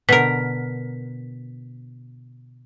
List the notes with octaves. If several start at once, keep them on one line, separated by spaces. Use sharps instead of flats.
B2 D3 A#4 B6